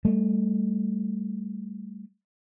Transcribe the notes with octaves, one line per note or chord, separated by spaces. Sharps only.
G3 A3